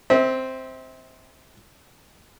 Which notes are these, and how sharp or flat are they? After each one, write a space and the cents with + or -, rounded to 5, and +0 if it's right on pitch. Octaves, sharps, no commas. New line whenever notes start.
C4 +0 E5 -35